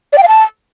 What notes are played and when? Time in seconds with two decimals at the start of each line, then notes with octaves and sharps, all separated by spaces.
0.13 D5
0.18 G5
0.23 F5
0.28 A5